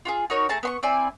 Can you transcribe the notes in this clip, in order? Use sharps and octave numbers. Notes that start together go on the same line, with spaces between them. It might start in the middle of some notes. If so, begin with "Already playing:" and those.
F4 F#4 G#4
D#4 F#4 A#4 C#5
A3 G#4 A5 A#5
B3 C6 C#6
C4 E4 D5 G#5